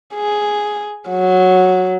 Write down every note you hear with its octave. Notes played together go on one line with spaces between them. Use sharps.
G#4
F#3